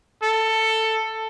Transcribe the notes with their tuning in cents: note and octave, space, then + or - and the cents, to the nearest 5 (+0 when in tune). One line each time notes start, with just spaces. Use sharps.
A4 +10